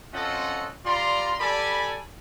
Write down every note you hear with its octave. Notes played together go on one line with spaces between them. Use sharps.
C4 C#4 F4 A4 D#5 F#5
G3 F4 D5 A#5 C6
G4 A4 D5 G#5 B5